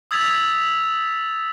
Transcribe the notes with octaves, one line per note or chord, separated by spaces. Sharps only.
D#6 E6 G#6 A6 B6 F7